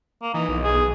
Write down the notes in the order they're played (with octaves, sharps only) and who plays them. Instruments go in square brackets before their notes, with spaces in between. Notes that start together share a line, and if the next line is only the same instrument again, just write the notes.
[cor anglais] A#3
[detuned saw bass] E3 [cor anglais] D#4
[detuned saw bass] B1
[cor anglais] G#4